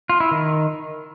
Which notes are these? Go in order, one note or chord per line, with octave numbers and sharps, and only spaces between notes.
F4
E4
D#3